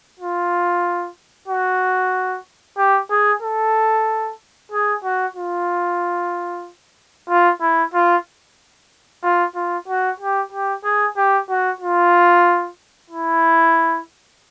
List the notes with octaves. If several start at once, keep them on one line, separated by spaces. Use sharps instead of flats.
F4
F#4
G4
G#4
A4
G#4
F#4
F4
F4
E4
F4
F4
F4
F#4
G4
G4
G#4
G4
F#4
F4
E4